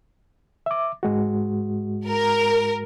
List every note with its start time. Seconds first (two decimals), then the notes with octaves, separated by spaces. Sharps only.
0.66 E5 D6
1.03 G#2 G#3 F#4
2.07 A#4